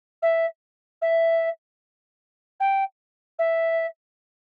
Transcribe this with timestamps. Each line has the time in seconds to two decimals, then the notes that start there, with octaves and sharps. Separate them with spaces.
0.22 E5
1.02 E5
2.60 G5
3.39 E5